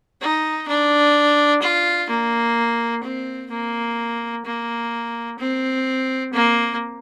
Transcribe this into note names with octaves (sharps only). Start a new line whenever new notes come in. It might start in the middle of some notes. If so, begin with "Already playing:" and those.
D#4
D4
F4
A#3
C4
A#3
A#3
C4
A#3